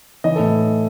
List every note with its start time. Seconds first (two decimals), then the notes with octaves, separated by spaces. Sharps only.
0.24 E3 D#5
0.36 A2 A4